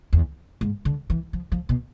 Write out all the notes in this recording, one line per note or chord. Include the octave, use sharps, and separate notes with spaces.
E2
G#2
D3
E3
F3
F3
B2